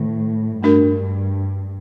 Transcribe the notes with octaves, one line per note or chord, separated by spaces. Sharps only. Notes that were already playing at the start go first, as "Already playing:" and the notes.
Already playing: A2 D#3
G2 A3 D4 F#4 A#4